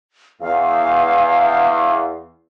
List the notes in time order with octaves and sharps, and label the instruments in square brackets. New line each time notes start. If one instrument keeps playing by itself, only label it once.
[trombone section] E2 [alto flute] F5